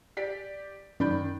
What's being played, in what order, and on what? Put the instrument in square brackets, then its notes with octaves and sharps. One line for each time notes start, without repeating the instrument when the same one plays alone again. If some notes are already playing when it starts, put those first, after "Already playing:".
[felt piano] G4 D5 B6
[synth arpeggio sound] F#2 [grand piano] D#3 [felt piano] D4 B5 G6